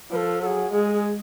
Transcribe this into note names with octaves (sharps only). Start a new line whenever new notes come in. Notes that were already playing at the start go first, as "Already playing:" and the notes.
F3 B4
A4
F#3 A4
G#4
G#3 G#4
G#4